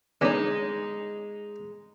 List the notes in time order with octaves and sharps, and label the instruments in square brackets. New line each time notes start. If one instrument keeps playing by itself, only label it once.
[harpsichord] D3 B3 C#4 [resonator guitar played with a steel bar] G#3 D#4